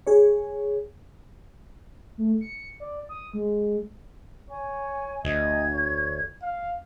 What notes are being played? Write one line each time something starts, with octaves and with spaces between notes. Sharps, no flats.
G#4 C#5
A3
C#7
D5
D#6
G#3
C#5 G#5
D2 D#5 G#6
C#5
F5